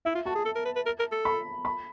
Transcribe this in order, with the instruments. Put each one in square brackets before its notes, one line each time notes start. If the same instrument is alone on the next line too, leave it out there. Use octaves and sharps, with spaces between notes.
[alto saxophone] E4 [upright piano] E5
[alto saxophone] F4
[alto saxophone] F#4 [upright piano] A5
[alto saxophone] G#4
A4
A#4
B4
B4
A#4
A#4
A4
[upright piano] B5
B5